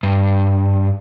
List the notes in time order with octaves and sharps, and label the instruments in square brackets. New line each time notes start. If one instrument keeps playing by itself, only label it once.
[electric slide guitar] G2